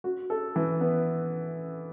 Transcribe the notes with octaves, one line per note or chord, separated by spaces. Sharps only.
F#4
A4
E3
B3